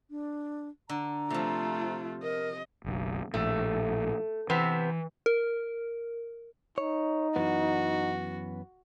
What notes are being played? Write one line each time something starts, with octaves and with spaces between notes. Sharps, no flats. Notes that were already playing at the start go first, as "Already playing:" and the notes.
D4
D3 A#5
C3 F3 A3 F4
A#4 D#5
F#1 B1
A#1 A2 A3
C3 E3 B3 C4
A#4
D#4 C#5
F#2 E3 B3 F#4